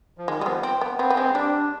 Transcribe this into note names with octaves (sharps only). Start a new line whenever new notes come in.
F3
D#3 G#3
G3 G#3
F3 B3
C4
B3
B3 C4
B3
G#3 C4
G3 D4